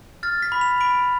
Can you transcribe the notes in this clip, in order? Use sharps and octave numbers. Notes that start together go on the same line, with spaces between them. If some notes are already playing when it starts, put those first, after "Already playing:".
F6 A6
B6
B5
F7
B5 D7